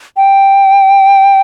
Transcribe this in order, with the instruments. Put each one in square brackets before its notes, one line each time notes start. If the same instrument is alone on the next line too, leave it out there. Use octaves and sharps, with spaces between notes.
[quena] G5